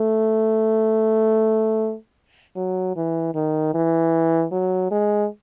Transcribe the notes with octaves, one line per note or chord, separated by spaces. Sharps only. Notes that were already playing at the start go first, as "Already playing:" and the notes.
Already playing: A3
F#3
E3
D#3
E3
F#3
G#3